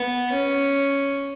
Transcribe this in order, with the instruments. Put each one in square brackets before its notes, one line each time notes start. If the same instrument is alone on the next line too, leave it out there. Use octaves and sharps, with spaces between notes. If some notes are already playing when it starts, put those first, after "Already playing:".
Already playing: [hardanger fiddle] B3
C#4